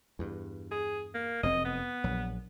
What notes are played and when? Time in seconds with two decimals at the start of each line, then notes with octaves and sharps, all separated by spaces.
0.19 E2 G2
0.71 G#4
1.14 A#3
1.43 F1 F#2 C4 D#5
1.65 B3
2.04 A#1 F#3